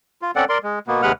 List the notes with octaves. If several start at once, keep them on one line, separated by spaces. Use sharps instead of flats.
F4
C4 C#4 A4 D5 F#5
A#4 D5 C6
G#3
B2 A#3 B3
D#2 C3 G#3 B4 F#5 F6